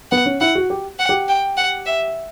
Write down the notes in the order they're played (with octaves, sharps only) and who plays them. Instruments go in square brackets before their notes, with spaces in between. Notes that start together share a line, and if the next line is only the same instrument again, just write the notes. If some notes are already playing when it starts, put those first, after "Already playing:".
[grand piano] B3 [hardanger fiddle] F#5
[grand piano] C#4
[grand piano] E4 [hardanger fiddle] F#5
[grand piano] F#4
G4
[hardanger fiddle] F#5
[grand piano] G4
[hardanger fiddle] G5
F#5
E5